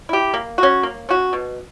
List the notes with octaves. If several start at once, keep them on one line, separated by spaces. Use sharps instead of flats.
E4 G4
A#3
C#4 F#4
A#3
C#4 F#4
B2